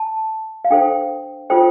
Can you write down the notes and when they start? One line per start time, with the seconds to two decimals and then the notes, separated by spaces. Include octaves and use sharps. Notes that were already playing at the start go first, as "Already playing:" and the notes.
Already playing: A5
0.65 F5
0.70 D4 A4 C5 G5
1.50 F4 A4 C5 G5